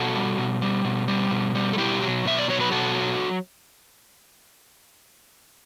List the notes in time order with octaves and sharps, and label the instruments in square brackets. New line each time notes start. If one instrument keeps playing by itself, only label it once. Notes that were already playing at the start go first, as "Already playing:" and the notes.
Already playing: [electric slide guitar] B2 F#4 A4
G3
B2
G3
B2
G3
B2
G3
A4
B2 E4 G4
F#3
B2 E5
D5
F#3 C#5
B4
B2 F#4 A4
F#3